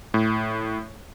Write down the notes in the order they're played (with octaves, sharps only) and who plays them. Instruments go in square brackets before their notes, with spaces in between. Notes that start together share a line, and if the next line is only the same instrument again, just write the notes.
[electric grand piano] A2